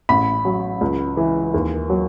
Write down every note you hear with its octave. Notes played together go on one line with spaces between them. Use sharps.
A1 B5
F#3
C#2
E3
D#2
F#3